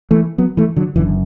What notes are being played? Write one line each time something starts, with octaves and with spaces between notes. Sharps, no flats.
E3 A3
F#3 B3
E3 A3
D3 F#3
F#1 F#2 D3 E3